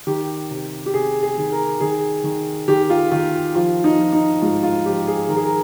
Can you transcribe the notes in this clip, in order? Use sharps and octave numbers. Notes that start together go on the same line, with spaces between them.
D#3 G4
C3
G4
C3 G#4
G#4
D#3
A#4
D#3 G#4
D#3
D#3 G4
F4
D#3 F4
F3 F4
D#4
F3
D#4
G#2 F4
F4
F3 G4
G#4
D#3 A#4
G#4
A#4